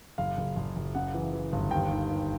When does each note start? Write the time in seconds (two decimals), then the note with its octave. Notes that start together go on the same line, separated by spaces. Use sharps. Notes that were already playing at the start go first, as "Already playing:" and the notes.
0.18 F#1 F5
0.37 F#1
0.56 F#1
0.76 F#1
0.95 C#3 F#5
1.14 E3
1.33 E3
1.52 G1
1.71 D#2 G5
1.91 D#3
2.09 D#3